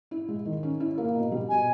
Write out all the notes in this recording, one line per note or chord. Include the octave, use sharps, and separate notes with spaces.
E4
G#3
D#3
C#4
E4
A#3
B2
G3
B2 G#5